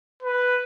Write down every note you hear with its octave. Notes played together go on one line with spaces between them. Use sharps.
B4